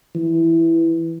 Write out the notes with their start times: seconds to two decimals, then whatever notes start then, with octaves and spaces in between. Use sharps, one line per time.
0.15 E3